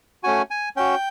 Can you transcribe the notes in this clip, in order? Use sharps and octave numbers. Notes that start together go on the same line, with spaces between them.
A3 C#4 F#4 G#5
G#5
C#4 F#4 G5